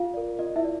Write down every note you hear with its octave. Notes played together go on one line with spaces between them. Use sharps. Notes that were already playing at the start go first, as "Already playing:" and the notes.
Already playing: F4 F5
A#4 D5
F4 D#5
E4 E5
D5